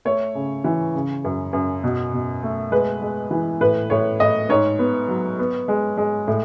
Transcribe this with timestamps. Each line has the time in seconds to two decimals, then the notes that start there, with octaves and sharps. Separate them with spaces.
0.05 A3 C#5
0.35 C#3
0.64 E3
0.95 C#3
1.24 F#2
1.53 F#2
1.84 B2
2.13 B2
2.43 A3
2.71 G#3 B4
3.01 G#3
3.31 E3
3.61 A2 B4
3.90 A2 C#5
4.20 A2 D#5
4.49 G#2 C#5
4.79 B3
5.09 F#3
5.39 B3
5.68 G#3
5.97 G#3
6.27 A2